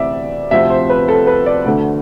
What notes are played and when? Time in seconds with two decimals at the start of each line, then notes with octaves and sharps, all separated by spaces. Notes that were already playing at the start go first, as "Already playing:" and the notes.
Already playing: D2 C3 E3 D5 E5
0.51 D2 C3 F3 C4 E5
0.70 C5
0.90 B4
1.08 A4
1.27 B4
1.46 D5
1.66 D2 D3 A3